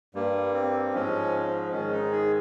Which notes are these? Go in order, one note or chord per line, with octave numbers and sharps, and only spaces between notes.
G2 G3 A#3
C4
G#2 F3 G#3 C#4
G#2 D#3 G#3 C#4
D#4
G#4